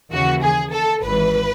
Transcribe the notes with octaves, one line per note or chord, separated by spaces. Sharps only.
D#2 C#3 E3 F#4
G#4
A4
G#1 G#2 E3 B4